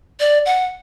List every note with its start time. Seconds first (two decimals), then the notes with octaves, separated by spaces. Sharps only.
0.20 D5
0.46 F#5